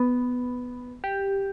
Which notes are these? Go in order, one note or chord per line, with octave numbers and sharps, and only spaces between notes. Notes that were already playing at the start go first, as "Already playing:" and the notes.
Already playing: B3
G4